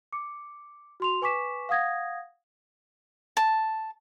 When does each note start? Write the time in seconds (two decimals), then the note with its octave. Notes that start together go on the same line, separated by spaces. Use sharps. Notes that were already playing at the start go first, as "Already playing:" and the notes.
0.12 D6 C#7
1.00 F#4 C6 F7
1.22 B4 G#5 C#6 D6 B6 E7
1.69 F5 F#5 D#6 G#6 A#6
3.37 A5